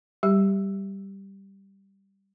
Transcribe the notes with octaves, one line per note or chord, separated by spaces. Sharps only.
G3 G4